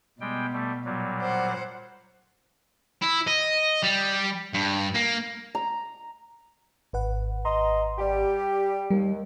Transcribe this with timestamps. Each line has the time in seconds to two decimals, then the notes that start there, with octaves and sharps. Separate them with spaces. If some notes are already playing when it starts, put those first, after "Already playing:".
0.21 B2 G3 G#3 G5
0.53 G3 A3
0.85 A#2 F#3 G3
1.21 C5 F#5
3.02 E4
3.27 D#5
3.83 G3
4.54 G2
4.94 A#3
5.55 A#5
6.93 G#1 B4 F#5
7.44 D#5 A#5 C6
7.98 G3 G4
8.90 D#2 G3